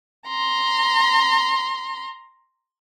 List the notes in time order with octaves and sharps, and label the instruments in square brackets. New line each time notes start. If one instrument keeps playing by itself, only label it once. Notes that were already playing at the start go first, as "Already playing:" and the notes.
[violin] A#5 C6